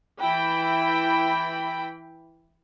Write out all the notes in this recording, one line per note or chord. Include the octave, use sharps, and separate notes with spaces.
E3 E4 G5 B5